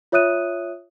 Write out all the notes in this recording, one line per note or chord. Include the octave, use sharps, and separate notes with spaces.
F4 C#5 E5 D#6 F#6 D#7